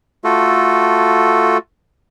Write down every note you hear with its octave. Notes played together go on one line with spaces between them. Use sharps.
A3 F4 F#4 A4